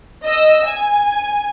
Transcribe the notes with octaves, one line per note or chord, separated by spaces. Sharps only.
D#5 E6
G#5